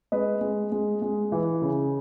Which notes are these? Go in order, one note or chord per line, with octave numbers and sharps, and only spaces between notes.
G#3 B4 D#5
G#3
G#3
G#3
E3
C#3